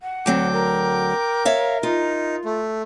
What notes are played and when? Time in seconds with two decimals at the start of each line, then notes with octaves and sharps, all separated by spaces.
0.01 F#5
0.26 D2 F#3 C4 G5 D6
0.53 A#4
1.45 C#5 E5 F5
1.83 D#4 F4
2.45 A3